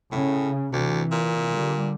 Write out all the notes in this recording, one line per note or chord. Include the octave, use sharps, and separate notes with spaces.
A2 C#3
D2 C3 E3
A#2
D3 G3